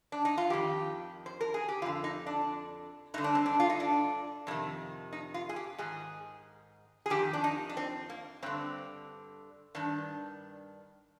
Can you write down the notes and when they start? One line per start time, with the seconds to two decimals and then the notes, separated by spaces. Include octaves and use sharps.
0.12 D4
0.25 D#4
0.38 F4
0.50 F2 D#3 G4
1.26 C5
1.41 A#4
1.54 G#4
1.69 G4
1.82 F2 F4
1.86 D3
2.04 D#4
2.26 D4
3.14 G2 D3 D#4
3.24 D4
3.35 C4
3.46 D4
3.60 F4
3.70 D#4
3.80 D4
4.47 F2 C3 D#3
5.13 D#4
5.34 F4
5.49 G#4
5.56 G4
5.78 G#2 D#3 G#4
7.06 G#4
7.10 F2 D#3 G4
7.33 D4
7.44 D#4
7.69 D4
7.77 C4
8.10 A#3
8.43 G2 D3 C4
9.75 G2 D#3 D4